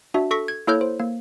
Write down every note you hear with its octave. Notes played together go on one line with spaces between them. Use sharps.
D4 F#4 E5
A4 C#6 A#6 B6
G#6
A#3 E4 A4 C#5 F6 G6
C5
A#3